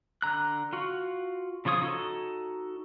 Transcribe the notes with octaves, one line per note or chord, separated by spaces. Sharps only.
D3 A#5 F#6
F4 F#4
C#3 F3 F4 C#5 D#6
D#4 F#4 A4